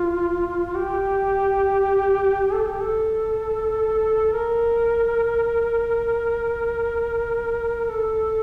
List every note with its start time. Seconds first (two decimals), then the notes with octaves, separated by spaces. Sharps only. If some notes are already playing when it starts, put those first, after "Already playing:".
Already playing: F4
0.75 G4
2.54 A4
2.68 G4
2.81 A4
4.33 A#4
7.89 A4